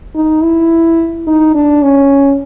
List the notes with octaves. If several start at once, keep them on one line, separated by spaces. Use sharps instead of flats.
D#4
E4
D#4
D4
C#4